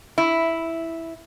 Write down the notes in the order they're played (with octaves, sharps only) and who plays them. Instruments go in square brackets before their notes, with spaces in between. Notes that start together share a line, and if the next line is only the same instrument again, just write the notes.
[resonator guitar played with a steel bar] E4